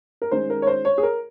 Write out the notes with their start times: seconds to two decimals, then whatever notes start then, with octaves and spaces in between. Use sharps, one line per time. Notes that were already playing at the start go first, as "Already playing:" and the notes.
0.22 A#4
0.31 D#3 G#3 C#4 C5
0.50 A#4
0.62 C#5
0.67 C5
0.85 C#5
0.98 G#4
1.03 A#4